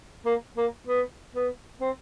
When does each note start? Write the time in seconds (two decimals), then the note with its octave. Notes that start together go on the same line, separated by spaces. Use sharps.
0.25 A#3
0.57 A#3
0.87 B3
1.34 B3
1.81 C4